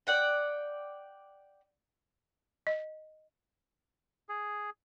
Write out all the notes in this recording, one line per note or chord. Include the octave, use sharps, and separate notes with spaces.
D5 F#5 G5
D#5
G#4